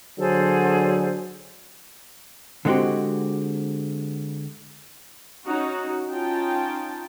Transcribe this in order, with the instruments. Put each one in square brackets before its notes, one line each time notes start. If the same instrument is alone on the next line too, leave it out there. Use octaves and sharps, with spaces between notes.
[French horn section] D3 F#3 [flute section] G#4 A4 C5
[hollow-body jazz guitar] D3 G#3 B3 C4 F#4 G4
[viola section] C#4 D#4 F#4
C#4 D#4 F4 G5 A5